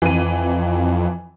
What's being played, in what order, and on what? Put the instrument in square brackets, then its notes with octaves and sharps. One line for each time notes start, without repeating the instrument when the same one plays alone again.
[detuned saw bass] F2 [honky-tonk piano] E3 D#7